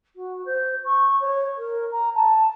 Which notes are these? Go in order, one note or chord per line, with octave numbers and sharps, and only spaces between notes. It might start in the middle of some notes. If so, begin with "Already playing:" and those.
F#4
C5
C#6
C#5
A#4
A#5
A5